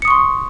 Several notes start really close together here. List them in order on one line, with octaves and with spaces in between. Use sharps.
C#7 D#6 C#6 C6